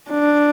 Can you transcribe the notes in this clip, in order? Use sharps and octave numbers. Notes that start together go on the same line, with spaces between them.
D4